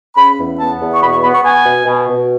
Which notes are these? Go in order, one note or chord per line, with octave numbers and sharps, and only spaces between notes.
C#3 B5
E2
B3 A5
E2
C#6
B2 B5
C#6
B3 B5
C#6
B3 G#5
B2
B2
B2